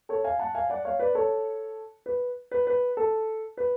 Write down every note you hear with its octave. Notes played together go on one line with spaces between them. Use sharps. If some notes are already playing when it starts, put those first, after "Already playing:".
A4 C#5
F5 G#5
F#5 A5
F5 G#5
D5 F#5
C#5 F5
B4 D5
A4 C#5
B4
B4
B4
A4
B4